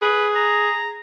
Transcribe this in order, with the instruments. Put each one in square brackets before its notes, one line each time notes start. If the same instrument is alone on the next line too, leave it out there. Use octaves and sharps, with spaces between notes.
[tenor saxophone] G#4 [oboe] B4
[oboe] A#5